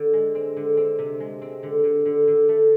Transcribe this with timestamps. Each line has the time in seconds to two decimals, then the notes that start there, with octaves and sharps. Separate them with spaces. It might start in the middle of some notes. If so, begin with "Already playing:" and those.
Already playing: D3
0.13 G#3
0.35 C4
0.57 D3
0.77 C4
0.99 C3
1.20 G#3
1.42 C4
1.63 D3
1.84 D3
2.05 D3
2.27 D3
2.49 A3